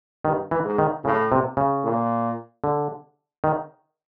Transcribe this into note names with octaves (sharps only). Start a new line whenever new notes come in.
G2 D#3
E3
G#2
D#3
A2 C#3
C3
C#3
A#2
D3
D#3